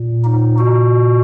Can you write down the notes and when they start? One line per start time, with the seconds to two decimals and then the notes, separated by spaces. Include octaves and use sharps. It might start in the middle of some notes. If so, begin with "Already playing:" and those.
Already playing: A#2
0.24 D#4
0.58 F#4